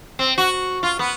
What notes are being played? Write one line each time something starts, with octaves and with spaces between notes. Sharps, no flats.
C4
F#4
F4
B3